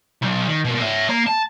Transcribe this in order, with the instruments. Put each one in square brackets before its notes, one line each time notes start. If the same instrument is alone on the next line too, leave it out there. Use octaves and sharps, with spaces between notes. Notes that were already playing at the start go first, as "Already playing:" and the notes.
[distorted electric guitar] B1
D#3
B2 A#3
C#5 E5
A#3 A#5
A5